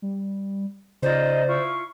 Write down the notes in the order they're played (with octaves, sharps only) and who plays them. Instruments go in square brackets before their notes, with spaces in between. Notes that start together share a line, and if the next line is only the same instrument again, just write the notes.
[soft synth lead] G3
[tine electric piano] C#3 A6 [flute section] D#4 F4 D#5 [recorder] C5 [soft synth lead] D5
[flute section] E4 F4 C#6